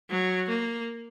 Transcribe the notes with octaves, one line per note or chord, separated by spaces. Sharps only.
F#3
A#3